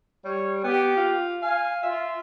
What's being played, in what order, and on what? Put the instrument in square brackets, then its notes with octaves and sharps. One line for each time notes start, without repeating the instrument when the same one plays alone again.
[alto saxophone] G3 [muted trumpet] C#5
[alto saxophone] B3 [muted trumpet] G4
[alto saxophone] F4
[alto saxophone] F5 [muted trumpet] G#5
[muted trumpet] F4 [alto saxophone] E5